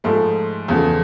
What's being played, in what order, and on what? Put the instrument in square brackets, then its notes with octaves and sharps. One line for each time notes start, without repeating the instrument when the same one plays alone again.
[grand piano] G#2 F3 A3
E2 C#3 F3 A3